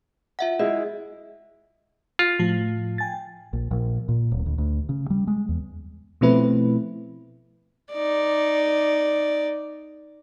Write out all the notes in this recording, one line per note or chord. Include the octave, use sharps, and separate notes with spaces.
F4 E5 F#5
G#3 E4 D#5
F4
A2 F3
G5 G#5 A6
A#1
A#1
A#2
D1
D2
D2
C#3
G3
G#3
E2
B2 F3 A3 C4 E4 B4
D#4 D5